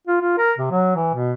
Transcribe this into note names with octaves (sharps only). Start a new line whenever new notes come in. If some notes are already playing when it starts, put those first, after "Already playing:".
F4
F4
A#4
C3
F#3
E3
B2